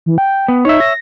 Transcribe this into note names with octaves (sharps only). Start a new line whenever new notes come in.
E3
G5
B3
D#4 C#5 E5
A#6